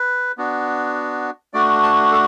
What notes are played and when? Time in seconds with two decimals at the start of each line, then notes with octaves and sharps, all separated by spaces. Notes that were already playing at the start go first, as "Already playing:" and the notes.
Already playing: B4
0.38 B3 D4 F#4
1.53 A3 D4 F#4 D5
1.83 A5
2.12 A4